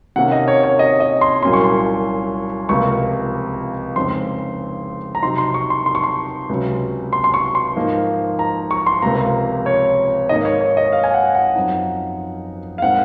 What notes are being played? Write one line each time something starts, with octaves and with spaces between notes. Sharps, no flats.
C3 D#3 A#3 C#4 F#5
D#5
C#5
C#5
D#5
D#5
C6
C2 A#2 F#3 C#4 C6
C#6
C6
C#2 C3 F3 A#3 C#6
F2 C#3 G#3 C4 D#4 C6
A#5
C3 F#3 C4 D#4 C6
C6
C#6
C6
C6
C#6
C6
C#2 C3 F#3 C#4
C6
C6
C#6
C6
G#2 F3 A#3 D#4
A#5
C#6
C6
C#2 C3 F3 A#3 A#5
C#5
G#2 D#3 A#3 D#5
C#5
C#5
D#5
F5
G#5
F#5
F#5
F#2 F3 C4 D#4
F5
A#2 G#3 C4 D#4 F#5